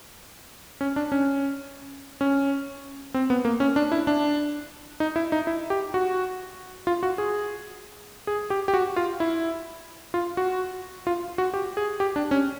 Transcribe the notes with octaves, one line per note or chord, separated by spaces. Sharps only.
C#4
D4
C#4
C#4
C4
B3
A#3
C#4
D4
E4
D4
D#4
E4
D#4
E4
G4
F#4
F4
F#4
G#4
G#4
G4
G4
F#4
F4
E4
F4
F#4
F4
F#4
G4
G#4
G4
D4
C#4